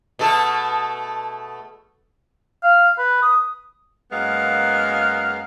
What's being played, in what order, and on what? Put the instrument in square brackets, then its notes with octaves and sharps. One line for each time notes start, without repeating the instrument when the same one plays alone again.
[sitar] B2 A3 A4
[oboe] F5
B4
D#6
[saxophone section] F#2 G#3 A#3 B3 F5